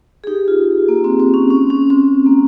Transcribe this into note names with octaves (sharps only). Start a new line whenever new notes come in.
G#4
D#4 G4
F4
A#3
C4
C4
C#4
C#4
C#4
C4
A#3